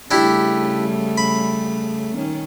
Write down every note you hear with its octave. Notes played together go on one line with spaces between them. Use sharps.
C#3 G3 A3 D4 E4 G4
B5
D#3 C#4